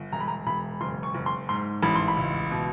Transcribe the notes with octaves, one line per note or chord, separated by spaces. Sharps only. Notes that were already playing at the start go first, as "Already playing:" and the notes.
Already playing: G1
E1 A#5
B5
A#5
E1 B5
F#1 C6
C#6
F#1
C6
G#2 C6
A1 B5
C6
B5
C#2
B2